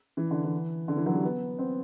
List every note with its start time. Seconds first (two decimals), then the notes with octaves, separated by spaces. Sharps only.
0.17 E3
0.31 D3
0.44 E3
0.88 D3
0.97 E3
1.06 F#3
1.14 G3
1.23 B3
1.58 C4